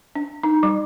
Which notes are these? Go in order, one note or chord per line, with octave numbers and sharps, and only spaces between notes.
D4
D#4
G3